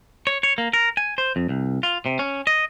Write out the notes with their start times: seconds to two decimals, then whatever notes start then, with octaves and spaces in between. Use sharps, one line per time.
0.27 C#5
0.43 C#5
0.58 A#3
0.73 A#4
0.97 G#5
1.18 C5
1.36 F2
1.49 C2
1.83 F4
2.06 C3
2.19 C#4
2.47 D#5